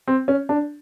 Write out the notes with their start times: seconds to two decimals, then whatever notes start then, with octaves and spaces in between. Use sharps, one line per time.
0.08 C4
0.28 C#4
0.49 D4